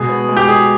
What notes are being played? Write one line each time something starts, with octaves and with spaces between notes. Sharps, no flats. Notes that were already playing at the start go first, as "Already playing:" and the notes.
Already playing: B2 G#3 G#4
B3
G#3
G4
G#3 G#4